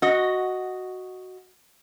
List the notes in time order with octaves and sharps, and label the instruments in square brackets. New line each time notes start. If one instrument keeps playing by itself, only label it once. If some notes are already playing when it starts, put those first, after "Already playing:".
[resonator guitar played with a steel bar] F#4 D#5